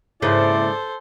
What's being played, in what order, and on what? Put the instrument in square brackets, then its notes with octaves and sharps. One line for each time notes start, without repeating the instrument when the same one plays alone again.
[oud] G#2 C#3 A#3 [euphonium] E4 [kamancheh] A4 C5 [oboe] D5